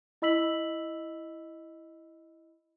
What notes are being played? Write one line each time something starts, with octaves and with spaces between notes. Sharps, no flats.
E4 D#5 B5 E6 B6 F#7